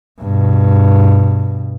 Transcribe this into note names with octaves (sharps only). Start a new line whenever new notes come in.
G2 B2